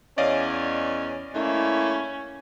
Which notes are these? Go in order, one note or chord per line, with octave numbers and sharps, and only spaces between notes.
E2 C#4 D5 D#5 F5
A3 A#3 C#4 E4